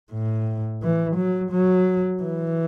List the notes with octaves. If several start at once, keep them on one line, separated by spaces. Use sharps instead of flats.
A2
E3
F#3
F#3
E3